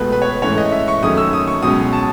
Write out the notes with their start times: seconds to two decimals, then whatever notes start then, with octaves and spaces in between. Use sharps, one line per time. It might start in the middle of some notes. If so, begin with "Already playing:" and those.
Already playing: C#2 B2 A3 B4
0.12 B4
0.22 C#5
0.31 B4
0.42 G#2 E3 A3 C#4 C#5
0.58 D#5
0.72 E5
0.88 C#6
1.03 F#2 D#3 A3 C#4 D#6
1.17 E6
1.33 D#6
1.48 C#6
1.62 C#2 B2 F#3 C#4 D#6
1.93 A5